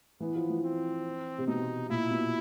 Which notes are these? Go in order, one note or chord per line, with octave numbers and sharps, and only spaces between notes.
E3 B3
F3
E3
C4
C3
B2 D#4
A#2 E4
B2